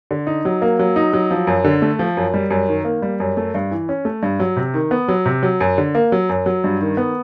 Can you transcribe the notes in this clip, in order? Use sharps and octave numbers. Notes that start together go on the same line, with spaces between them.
D3
D#4
F#3
A#3
F#3
D#4
F#3
F3
F#2
D3
A3
F3
F#2
G3
F#2
D#3
A#3
G3
F#2
A3
G2
E3
C#4
A3
G2
F#3
C3
D#3
B3
F#3
C3
F#3
F#2
D3
A#3
F#3
F#2
F#3
G2
D#3
B3